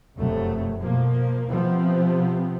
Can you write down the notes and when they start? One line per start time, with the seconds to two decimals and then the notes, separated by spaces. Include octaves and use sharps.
0.17 F1 F#2 F#3 A3
0.78 B2 F3 A#3
1.49 C3 F3 B3 C4